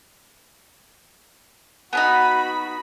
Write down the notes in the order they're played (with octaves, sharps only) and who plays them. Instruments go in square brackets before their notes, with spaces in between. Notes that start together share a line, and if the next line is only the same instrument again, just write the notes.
[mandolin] B3 D4 D#4 [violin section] F#4 B5